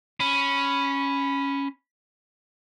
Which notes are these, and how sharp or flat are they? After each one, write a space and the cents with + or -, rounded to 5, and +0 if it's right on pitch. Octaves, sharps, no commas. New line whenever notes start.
C#4 +0 B5 +0